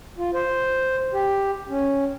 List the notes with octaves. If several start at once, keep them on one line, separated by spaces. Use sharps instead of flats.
F4
C5
G4
C#4